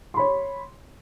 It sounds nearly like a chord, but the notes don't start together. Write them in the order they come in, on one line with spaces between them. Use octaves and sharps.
C6 B5 C#5